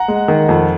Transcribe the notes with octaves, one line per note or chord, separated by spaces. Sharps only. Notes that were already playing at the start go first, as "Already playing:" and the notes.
Already playing: F#5 A#5
G#3
D#3
F2